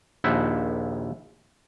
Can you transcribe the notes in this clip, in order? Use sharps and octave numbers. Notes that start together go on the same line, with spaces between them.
A#1 D#2 E4 C5 E5 F#5